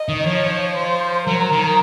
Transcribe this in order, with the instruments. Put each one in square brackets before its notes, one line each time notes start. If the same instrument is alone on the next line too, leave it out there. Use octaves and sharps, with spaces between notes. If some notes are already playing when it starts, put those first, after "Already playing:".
Already playing: [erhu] D#5
[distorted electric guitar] D#3
[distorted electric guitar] F3 [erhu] C#5
[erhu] C5
[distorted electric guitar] F#3 [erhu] A#4
[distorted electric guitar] D#3